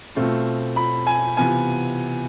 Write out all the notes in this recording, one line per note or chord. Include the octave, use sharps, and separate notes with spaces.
B2 A3 C4 F4
B5
G#5
C3 E3 B3 F4 G#5